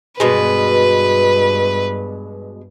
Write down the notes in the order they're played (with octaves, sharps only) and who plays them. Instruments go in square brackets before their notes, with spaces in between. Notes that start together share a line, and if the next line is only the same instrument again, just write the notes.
[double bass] G2 [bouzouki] B2 G#3 [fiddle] B4